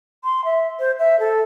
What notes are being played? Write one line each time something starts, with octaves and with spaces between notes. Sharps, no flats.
C6
E5
C5
E5
A4